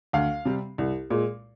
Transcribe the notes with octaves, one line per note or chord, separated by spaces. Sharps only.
D2 F5
C3 G3
C2
A#2 G#3